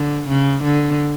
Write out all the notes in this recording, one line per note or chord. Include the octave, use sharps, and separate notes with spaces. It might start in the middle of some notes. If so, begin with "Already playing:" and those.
Already playing: D3
C#3
D3